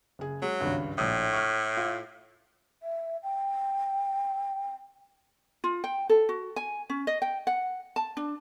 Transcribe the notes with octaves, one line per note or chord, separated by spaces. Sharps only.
F#1 G#4
F#3 G#3
G#1 C#2 G2
A#1 A2 D#6
C#6 F6
F4
E5
G5
F4
G5
A4
F#4
G#5
C#4
D#5
G5
F#5
A5
D4